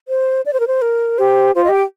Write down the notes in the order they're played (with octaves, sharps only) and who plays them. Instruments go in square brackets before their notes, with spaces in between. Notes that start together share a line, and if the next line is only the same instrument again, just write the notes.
[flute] C5
D5
C5
A#4
C5
A#4
[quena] G4 [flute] C5
[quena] F4 [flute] C5
[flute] D#5
[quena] G4
[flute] G5